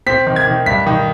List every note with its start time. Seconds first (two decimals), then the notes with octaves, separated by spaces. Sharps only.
0.06 C4 B6
0.27 D#3
0.36 G#6
0.47 D#3
0.66 G2 B6
0.86 D#3